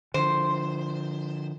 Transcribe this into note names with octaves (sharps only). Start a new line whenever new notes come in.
D3 F3 C5